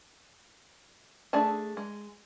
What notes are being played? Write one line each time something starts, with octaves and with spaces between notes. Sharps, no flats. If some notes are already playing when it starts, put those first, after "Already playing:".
A3 D4 G#4 A5
G#3